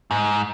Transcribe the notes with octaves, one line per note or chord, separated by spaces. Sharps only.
G#2